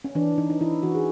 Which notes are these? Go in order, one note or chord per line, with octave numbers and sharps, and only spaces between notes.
C#4
E3 D4
E3 D#4
D#4
E3 E4
E3 F#4
G#4